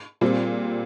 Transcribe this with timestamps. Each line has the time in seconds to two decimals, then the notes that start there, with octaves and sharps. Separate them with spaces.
0.21 A#2 G3 C4